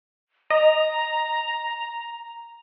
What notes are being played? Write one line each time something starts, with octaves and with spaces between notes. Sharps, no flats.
D#5 A#5